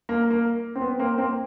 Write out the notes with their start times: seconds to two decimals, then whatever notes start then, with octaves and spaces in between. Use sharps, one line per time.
0.09 A#3
0.30 A#3
0.76 C4
0.81 B3
0.99 A#3 C4
1.18 A#3 C4